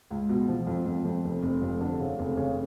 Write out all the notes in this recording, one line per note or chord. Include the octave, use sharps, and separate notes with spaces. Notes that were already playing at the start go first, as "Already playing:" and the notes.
C#2
B2
F3
F2
F2
F2
F1
F1
F2
D3
C#3
F1
C#3